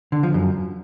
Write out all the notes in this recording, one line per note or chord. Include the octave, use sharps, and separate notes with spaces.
D3
F3
F#2